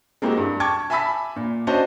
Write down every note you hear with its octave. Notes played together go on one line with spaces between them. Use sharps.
G#3 A#3 C4 E4 F#4 G4
G2
G5 A5 C#6 D6 G#6
E5 G#5 A5 B5 E6 B6
A#2
C#4 D4 F#4 C5 D#5 A5